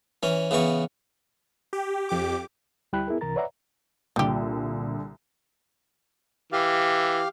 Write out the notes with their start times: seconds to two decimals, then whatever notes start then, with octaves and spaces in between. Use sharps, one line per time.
0.23 E3 C#4
0.51 C#3 E3 B3 C#6
1.73 G4
2.09 F2 G4 D6
2.93 D2 G3 E4 G5 B5 F#6
3.08 B3 E4 G#4 A#4
3.21 C2 C3 E3 A#4 A#5 A6
3.36 B4 C#5 D5 E5 F#5 A#5
4.16 C2 A#2 D3 G3 G4
6.52 E3 G4 F5